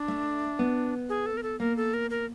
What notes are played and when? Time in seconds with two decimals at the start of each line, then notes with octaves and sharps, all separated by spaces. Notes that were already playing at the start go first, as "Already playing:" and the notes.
Already playing: D4
0.08 A3
0.59 B3
1.09 G#4
1.26 A4
1.37 A#4
1.43 A4
1.60 A#3 A#4
1.77 A4
1.94 A#4
2.10 A#4